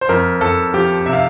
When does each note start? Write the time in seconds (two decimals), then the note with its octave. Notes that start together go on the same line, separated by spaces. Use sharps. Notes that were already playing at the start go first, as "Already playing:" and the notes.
0.01 C5
0.09 F2 A#4
0.41 F2 A4
0.74 F3 G4
1.06 C3 E5
1.13 F5